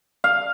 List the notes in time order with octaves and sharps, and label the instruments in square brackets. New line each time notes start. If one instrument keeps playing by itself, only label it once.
[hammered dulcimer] F5